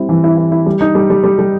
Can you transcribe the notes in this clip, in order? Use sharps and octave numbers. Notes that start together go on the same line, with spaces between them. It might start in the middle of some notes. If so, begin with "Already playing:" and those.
Already playing: G3 C4 E4
E3
E4
E4
E4
G3
D#4
G3
G3
G3
G3